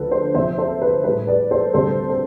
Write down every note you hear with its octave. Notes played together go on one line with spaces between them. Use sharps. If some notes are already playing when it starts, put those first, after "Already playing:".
Already playing: D2 D3 F3 A4 B4
A4 C5
D2 C3 F3 C5 E5
A4 C5
B4
A2 G3 B4
B4 D5
A4 C5
D2 C3 G3 A4 C5
A4